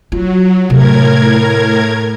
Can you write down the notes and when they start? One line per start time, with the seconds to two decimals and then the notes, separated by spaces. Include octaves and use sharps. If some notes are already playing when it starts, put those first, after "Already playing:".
0.12 F#3 F4
0.70 A2 C3 A#4 G#6